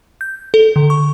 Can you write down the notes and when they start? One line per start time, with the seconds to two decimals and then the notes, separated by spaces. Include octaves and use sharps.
0.21 G6
0.54 A4
0.76 D3
0.90 C#6